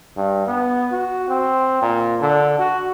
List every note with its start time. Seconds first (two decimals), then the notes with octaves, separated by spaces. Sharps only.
0.17 G2
0.48 B3
0.92 F#4
1.29 C4
1.82 A#2
2.21 D3
2.59 F#4